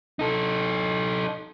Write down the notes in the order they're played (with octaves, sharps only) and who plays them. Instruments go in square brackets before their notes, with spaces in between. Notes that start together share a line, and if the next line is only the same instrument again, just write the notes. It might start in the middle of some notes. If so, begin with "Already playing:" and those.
[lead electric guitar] D#4 A4